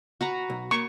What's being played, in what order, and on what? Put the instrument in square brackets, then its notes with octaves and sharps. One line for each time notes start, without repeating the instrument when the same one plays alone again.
[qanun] F#4 B4 A#5
[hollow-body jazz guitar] B1
[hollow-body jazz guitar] A#3 B5 [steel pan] C#6